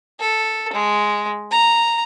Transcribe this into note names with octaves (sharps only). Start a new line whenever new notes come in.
A4
G#3
A#5